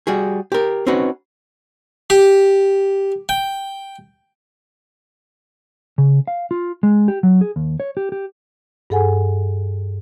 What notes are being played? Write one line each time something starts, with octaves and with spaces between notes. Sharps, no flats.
G3 F#4 G#4
G4 A#4
C4 C#4 D#4 F#4 B4
G4
G5
C#3
F5
F4
G#3
G4
F#3
G#4
D#2
C#5
G4
G4
G2 G#4 A4 F#5 G#5